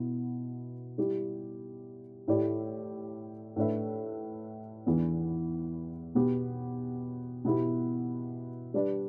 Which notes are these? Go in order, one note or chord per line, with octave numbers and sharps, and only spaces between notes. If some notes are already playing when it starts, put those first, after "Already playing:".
Already playing: B2 B3 E4
G3 E4 G4
A2 A3 E4 G4 D5
A2 A3 D4 B4 E5
E2 E3 B3 D4
B2 B3 G4
B2 B3 E4 G4
G3 D4 B4 D5